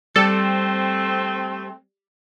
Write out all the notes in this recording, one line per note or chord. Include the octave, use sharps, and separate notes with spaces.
G3 A3 C4 A4